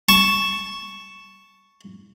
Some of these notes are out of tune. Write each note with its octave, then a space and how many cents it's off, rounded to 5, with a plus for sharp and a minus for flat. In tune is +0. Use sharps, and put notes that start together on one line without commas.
A5 +0 C#6 +0